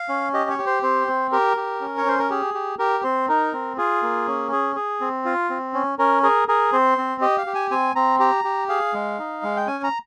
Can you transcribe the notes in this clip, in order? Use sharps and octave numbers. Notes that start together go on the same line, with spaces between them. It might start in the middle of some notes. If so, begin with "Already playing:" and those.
Already playing: F5
C#4
G4 D#5
C#5
G4
C5
C4 C5
C4
G4 A#4
G4
C#4
C#5
C#4 C5
A#4
G4 G#4
G4
G4 A#4
C4 C5
D#4 A#4
C4
F4 G#4
A#3
C#4
G#4
G#4
C4
F4
C4
C#4
C#4 A#4
G#4 A#4
G#4 A#4
C4 C5
C4
G4 D#5
F5
G4
G#5
C4 G#5
C4 A#5
G4 A#5
G4
G#4 F5
G#3
D#4
G#3
G5
C#4 G#5
A#5